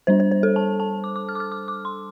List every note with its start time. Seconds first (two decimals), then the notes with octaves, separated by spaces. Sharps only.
0.07 G3 D4 C5
0.20 C5
0.31 C5
0.43 A4
0.56 A5
0.80 A5
1.04 D6
1.16 D6
1.29 F6
1.35 D6
1.40 F6
1.52 D6
1.68 D6
1.85 C6